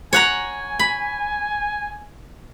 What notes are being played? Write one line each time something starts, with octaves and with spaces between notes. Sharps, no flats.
C#5 F#5 G#5 A#5
B5